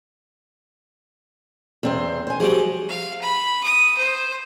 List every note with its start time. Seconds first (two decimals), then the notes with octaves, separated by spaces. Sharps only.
1.83 E2 C4 C5
2.27 C5 G#5
2.40 F3 G3 F#4 G#4
2.89 F5
3.21 B5
3.63 D#6
3.98 C5